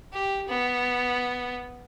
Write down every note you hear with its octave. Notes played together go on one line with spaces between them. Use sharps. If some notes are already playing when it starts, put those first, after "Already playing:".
G4
B3